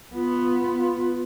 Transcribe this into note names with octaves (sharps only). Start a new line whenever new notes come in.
B3 F4